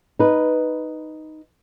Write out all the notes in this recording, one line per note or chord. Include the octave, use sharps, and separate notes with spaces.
D#4 B4